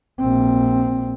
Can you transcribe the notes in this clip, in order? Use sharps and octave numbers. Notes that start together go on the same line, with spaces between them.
A#1 C4